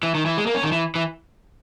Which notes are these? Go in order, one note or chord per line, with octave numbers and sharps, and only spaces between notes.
E3
D#3
E3
G#3
A#3
C#4
D#3
E3
E3